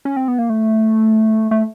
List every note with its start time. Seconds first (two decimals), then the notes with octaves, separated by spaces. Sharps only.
0.05 C#4
0.17 C4
0.28 B3
0.39 A#3
0.50 A3
1.51 A3